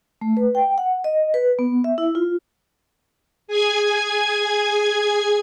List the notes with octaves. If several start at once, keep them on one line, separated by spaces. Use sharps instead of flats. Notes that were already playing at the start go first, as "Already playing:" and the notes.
A3
B4
G5
F#5
D#5
B4
B3
E5
E4
F4
G#4 G#5 G#6